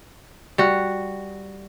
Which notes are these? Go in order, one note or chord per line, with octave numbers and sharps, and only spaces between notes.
G3 F#4